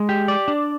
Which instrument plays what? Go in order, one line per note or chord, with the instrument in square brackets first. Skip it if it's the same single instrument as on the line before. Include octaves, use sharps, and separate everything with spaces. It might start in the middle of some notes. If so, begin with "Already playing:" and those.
Already playing: [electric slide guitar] G#3
G4
D5
D4